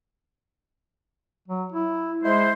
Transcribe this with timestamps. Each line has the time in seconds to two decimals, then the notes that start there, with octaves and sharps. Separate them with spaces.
1.48 F#3
1.72 E4
2.23 G#3 E4 C5